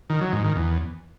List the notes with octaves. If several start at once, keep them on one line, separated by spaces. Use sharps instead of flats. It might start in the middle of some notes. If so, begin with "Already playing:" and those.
D#3
F#3
G#2
D#3
E2